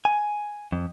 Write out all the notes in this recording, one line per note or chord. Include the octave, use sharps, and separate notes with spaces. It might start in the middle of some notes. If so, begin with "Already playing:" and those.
G#5
F2